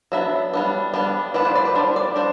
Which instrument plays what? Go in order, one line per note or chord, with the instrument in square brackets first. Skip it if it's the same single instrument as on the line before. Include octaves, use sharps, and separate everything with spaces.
[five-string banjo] F#3 B3 D4 E5
G3 B3 D4
G3 B3 D4
E3 B3 D4 D5
C5
D5
B4
G3 D4 C5
D5
D4 C5